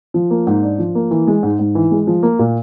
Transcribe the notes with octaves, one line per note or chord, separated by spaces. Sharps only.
F3
A#3
G#2
D4
F3
A#3
E3
G#3
G#2
G#2
E3
G#3
F3
A#3
A#2